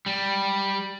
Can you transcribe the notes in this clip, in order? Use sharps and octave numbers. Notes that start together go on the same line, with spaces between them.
G3